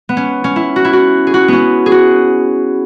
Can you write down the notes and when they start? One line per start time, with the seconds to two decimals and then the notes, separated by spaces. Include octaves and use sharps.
0.09 B3
0.17 C#4
0.44 C#4
0.56 E4
0.76 F#4
0.85 E4
0.93 F#4
1.27 G#4
1.34 F#4
1.48 B3 C#4
1.86 G#4
1.92 F#4